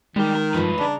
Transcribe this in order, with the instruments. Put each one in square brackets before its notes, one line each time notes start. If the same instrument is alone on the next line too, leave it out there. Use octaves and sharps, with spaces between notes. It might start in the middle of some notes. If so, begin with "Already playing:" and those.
[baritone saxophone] D#3 [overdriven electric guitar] G3 G4 [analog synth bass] G#3
[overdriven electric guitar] A#4
[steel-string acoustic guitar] G2 F3 [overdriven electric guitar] D#4 B4
[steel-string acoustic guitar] C#3 A#5 [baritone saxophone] D4